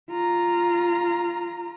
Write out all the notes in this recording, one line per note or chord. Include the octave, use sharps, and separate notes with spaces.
F4 A#5